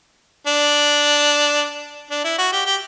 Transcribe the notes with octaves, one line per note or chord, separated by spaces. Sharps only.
D4
D4
E4
F#4
G4
G4